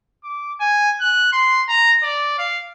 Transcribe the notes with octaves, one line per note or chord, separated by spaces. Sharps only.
D6
G#5
F#6
C6
A#5
D5
F5